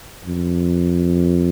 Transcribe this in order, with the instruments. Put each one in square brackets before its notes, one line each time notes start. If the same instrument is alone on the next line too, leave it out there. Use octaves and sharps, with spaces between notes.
[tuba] F2